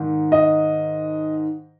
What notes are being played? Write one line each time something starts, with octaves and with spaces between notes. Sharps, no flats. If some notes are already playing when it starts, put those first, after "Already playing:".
Already playing: G#2 D#3
D#5